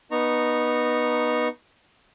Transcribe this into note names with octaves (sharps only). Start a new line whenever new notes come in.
B3 D#4 A#5 C#6